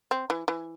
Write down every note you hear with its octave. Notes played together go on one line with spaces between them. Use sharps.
C4
E3
E3